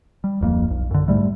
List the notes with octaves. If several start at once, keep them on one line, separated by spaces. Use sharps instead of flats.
G3
D1 F2 A#3
B1
F#2 D3
G#2 G3 A3